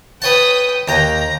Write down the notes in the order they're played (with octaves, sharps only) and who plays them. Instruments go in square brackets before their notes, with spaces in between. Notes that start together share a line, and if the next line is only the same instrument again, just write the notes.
[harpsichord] B4 C#5 A5 [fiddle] G5 D#6
[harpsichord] D#2 G5 [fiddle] A#5